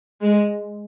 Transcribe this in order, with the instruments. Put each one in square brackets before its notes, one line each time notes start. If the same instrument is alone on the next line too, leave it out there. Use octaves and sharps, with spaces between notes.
[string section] G#3